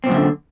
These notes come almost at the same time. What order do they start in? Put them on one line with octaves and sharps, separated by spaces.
C4 A#2 F#2 F3 D3